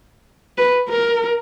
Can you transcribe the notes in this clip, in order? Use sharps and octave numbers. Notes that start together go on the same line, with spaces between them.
B4
A#4